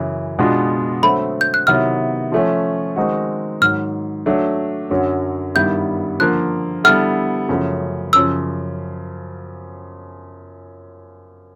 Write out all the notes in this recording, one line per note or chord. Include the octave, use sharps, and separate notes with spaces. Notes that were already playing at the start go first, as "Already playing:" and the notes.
Already playing: F#2 C#3 E3
B2 G#3 B3 D4 F4
D3 F#3 A3 C4 B5
G6
F#6
C3 D#3 F#3 B3 E4 F6
F3 A3 C#4
D#3 G#3 C4 D#4 F#4
G#2 D#3 F#3 F6
F#3 A3 D4
F#2 D3 F#3
G2 D#3 G3 B3 E4 G6
D3 F3 A#3 F#6
D3 G3 B3 E4 A4 F6
F#2 C#3 F3 A3
F#2 C#3 F3 E6